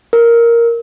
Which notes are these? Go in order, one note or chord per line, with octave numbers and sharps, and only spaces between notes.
A#4